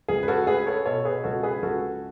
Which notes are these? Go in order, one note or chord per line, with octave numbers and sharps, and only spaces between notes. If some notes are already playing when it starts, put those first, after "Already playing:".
C#2 G#4
B4
F#4 A4
A3 G#4 B4
A4 C#5
B2 A4 C#5
G#4 B4
C#2 F#4 A4
G#4 B4
C#2 F#4 A4